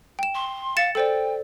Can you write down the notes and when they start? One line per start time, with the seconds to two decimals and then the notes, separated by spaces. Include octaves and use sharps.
0.19 G5 E7
0.34 C6
0.77 F5 A6 C#7 E7
0.95 A4 C5 D5 G5